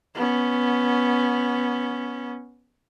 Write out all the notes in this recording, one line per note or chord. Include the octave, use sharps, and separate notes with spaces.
B3 C#4